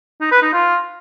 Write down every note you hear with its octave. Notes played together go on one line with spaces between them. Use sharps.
D#4
B4
D#4
F4